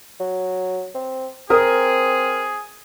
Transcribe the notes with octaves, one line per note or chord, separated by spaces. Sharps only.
F#3
C4
C4 G#4 A#4 D#6